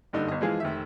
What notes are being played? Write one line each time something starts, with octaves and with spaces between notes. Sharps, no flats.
F#1 G2 D3 D#4
G1 D#5
E3 F3 G#3 F4 G#4
F1 D#3 E5